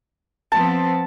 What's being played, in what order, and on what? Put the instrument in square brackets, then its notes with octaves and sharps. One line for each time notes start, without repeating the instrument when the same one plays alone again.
[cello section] F3 B3 C4 [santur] A5